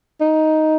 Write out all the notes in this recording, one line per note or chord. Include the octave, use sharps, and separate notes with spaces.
D#4